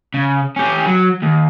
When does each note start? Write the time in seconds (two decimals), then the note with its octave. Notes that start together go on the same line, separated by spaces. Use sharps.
0.14 C#3
0.56 C#4 G4
0.87 F#3
1.23 D#2